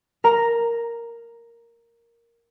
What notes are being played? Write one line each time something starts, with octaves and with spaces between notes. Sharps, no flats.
A#4 A#5